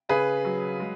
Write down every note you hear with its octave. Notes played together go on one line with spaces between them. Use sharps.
C#3 G#4 B4
F#3
G#3